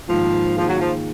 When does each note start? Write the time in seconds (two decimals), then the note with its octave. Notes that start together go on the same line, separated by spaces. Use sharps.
0.09 G#2 D#3 F3 A#3
0.56 D#3 F3 A#3 F4 G#4
0.69 F#3
0.80 F3